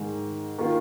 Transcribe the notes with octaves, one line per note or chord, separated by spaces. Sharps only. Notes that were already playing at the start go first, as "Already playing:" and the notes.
Already playing: G#2 D#3 G#3
D#3 A#3 F4